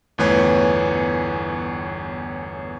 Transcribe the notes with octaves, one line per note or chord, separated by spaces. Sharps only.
G1 E2 A2 B4 C#5 G#5